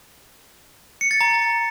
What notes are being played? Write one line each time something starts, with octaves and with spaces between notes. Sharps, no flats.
C#7
A6
A#5